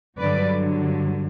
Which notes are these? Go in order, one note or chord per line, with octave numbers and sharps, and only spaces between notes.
G2 D3 F#3 B4 D5